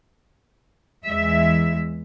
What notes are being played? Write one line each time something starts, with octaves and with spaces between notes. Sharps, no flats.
E2 E3 G#3 E5